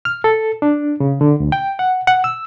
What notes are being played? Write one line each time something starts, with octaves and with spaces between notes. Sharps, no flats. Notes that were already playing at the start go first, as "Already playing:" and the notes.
F6
A4
D4
C#3
D3
D2
G5
F#5
F#5
E6